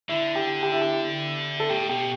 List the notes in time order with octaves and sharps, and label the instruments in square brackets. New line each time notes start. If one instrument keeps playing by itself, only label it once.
[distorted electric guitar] D3 [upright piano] E4
[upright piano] G4
G4
E4
G4
A4
[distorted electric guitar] A2 [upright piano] G4
[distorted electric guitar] B2 [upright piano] G4